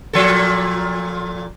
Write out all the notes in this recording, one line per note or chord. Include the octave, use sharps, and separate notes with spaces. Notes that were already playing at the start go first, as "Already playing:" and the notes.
A#2 F3 A4